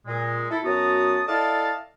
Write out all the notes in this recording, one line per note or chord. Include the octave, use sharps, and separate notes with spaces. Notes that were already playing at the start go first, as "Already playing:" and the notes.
A#2 G#3
E4 A4
F#2 B3 F#4 A5 A#5 D#6
E4 A4 D5 D#5 F5 A5